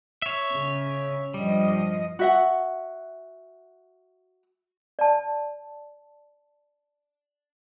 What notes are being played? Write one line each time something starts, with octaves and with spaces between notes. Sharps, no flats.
C#5 E5
C#3
G2 F3 G3 D#5
F#4 E5 F#5
D5 A5